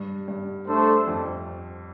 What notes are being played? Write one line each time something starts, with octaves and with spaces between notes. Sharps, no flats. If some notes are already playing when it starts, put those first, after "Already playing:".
Already playing: G2
G2
A3 D4 A4 C5
F2